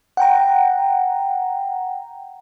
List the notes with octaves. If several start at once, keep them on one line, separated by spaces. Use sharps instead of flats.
F#5 G5 A#5